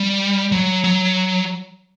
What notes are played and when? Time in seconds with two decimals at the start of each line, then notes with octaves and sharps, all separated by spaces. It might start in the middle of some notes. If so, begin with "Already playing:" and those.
Already playing: G3
0.52 F#3
0.84 F#3